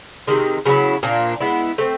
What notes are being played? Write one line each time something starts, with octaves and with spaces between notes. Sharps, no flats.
C3 D#3 G#3
C#3 F#3 B3 E4
A#2 F3 A#3 D4
G#3 B3 E4
A3 C4